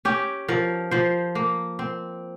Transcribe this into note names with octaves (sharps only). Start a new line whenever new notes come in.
C#4 G4
F3 A#4
F3 C5
A#3
C4